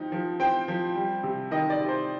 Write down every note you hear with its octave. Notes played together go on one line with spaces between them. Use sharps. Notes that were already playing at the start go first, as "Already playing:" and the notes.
Already playing: F3 C4 D#4 G5
F3
C4 G5
F3
G3
C3
D#3 D#5
D5
C3
C5